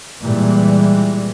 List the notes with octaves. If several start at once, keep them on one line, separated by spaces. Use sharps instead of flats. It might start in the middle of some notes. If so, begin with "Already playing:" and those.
A#2 E3 G3 G#3